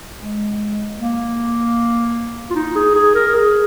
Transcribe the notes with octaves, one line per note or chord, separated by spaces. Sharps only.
G#3
A#3
F4
D#4
G#4
G#4
A#4
G#4